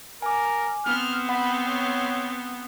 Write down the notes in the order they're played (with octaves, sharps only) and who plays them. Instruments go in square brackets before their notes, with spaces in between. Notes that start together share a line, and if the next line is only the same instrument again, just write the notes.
[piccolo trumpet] A#4 [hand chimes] G#5 D6
[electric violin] B3 C4 [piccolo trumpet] F6
[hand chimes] F#5 [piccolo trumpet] B5
[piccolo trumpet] C#5